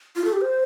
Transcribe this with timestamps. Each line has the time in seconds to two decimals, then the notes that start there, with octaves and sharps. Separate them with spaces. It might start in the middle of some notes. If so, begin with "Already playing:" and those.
0.16 F4
0.25 A4
0.33 G4
0.41 C5